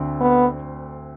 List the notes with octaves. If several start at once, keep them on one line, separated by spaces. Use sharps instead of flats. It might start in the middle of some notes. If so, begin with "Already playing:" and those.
Already playing: D2 D3 C4
B3